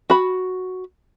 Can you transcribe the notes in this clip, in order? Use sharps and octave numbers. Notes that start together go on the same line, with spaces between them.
F#4 B5